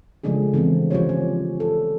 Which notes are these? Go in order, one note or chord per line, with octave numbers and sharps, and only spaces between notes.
C#3 F3 G#3 A3 D4 G#4
D3 E3 B3 C4
F3 C#4 F4 G4 C5 C#5
C#4
A4